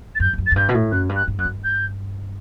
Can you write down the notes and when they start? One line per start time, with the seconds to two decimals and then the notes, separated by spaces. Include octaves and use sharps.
0.15 A6
0.20 F#2 G6
0.33 E2
0.38 F#2
0.46 A6
0.51 F#2
0.56 G2 G6
0.69 B2
0.74 A2
0.91 F#2 F#6
1.09 G2
1.16 F#6
1.28 G2
1.38 F#2 F#6
1.45 G2
1.63 G6